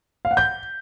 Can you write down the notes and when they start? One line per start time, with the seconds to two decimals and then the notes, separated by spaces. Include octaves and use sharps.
0.25 F5
0.31 F#5
0.37 G6